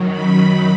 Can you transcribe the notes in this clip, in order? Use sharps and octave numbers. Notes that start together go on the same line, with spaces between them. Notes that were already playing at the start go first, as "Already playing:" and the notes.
Already playing: F#2 D#3 F#3
B5